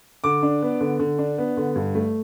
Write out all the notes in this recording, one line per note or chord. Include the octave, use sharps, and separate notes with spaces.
D3 D6
D4
B3
D3
D3
D4
B3
D3
G2
A3